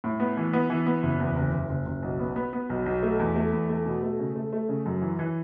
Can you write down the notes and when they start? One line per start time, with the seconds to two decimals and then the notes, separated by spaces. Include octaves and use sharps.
0.04 A2
0.20 B3
0.37 E3
0.53 B3
0.70 E3
0.86 B3
1.03 F#1
1.20 E2
1.36 F#1
1.53 F#1
1.69 F#1
1.86 F#1
2.03 B1
2.19 B3
2.36 B3
2.53 B3
2.70 B1
2.86 B1
3.03 A3
3.19 E2
3.36 A3
3.53 E2
3.69 A3
3.86 B2
4.03 A3
4.19 C#3
4.36 A3
4.53 A3
4.69 C#3
4.86 F#2
5.02 E3
5.19 E3